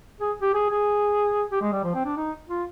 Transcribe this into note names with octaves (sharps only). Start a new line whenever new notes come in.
G#4
G4
G#4
G#4
G4
G#3
G3
F3
C4
D4
D#4
F4